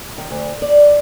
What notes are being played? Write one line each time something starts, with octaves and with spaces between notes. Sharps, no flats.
D#3
D2
D5